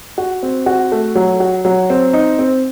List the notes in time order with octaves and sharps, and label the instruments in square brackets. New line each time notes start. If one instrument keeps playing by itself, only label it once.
[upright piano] F#4
C4
F#4
A3
F#3
F#4
F#3
C4
D#4
C4